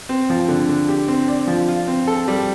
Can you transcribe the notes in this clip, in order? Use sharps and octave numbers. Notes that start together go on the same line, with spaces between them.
C4
F3
D3
D3
G4
C4
D5
F3
F4
C4
A4
G3